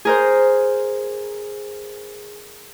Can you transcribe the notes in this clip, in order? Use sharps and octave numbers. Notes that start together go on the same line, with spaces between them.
G#4 A#4 C5